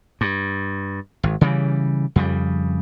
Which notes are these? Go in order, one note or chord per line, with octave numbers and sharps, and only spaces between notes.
G2
G#1
C#3 E3 G3
F2 C#3 G3